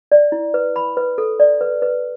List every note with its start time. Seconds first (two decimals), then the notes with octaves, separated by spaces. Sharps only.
0.12 D5
0.32 E4
0.54 B4
0.76 B5
0.97 B4
1.18 A4
1.40 D5
1.61 B4
1.82 B4